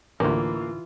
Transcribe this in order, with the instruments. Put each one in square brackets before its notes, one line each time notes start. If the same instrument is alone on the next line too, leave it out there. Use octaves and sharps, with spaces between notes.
[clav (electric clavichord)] A1 D2 [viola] E3 F4 [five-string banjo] A#3